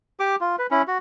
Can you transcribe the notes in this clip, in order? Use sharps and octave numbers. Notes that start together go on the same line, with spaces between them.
G4 D6
F4
B4
C#4 E4
F#4